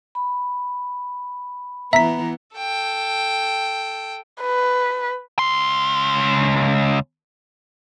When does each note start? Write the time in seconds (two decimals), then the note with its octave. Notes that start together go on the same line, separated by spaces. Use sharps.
0.15 B5
1.93 E3 B3 E5 A#5 B6
2.57 A4 G5
4.42 B4
5.39 C#2 C6